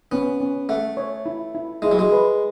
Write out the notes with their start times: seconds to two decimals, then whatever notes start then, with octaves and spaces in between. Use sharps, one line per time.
0.12 B3 C#4
0.40 C#4
0.69 A3 F#5
0.97 C#5
1.26 E4
1.55 E4
1.82 G#3 E4
1.91 F#3
1.99 G#3
2.12 B4